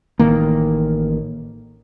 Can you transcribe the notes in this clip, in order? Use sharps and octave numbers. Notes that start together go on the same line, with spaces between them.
A1 D#3 A#3